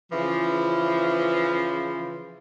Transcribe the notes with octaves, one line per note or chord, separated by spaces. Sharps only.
C#3 E3 F3